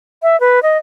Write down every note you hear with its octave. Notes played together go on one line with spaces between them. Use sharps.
E5
B4
D#5